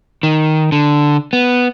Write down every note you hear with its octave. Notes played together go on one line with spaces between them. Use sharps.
D#3
D3
B3